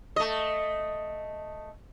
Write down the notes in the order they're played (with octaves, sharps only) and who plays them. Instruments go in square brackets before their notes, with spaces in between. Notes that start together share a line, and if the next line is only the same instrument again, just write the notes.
[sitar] A3 D#5